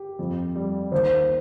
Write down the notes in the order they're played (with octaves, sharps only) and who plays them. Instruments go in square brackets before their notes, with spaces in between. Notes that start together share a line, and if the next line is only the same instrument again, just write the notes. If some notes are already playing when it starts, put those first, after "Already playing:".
Already playing: [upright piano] G4
F2
G3
[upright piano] D#2 [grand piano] C5